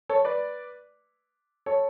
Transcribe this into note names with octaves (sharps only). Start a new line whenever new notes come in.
A4 C#5
B4 D5
A4 C#5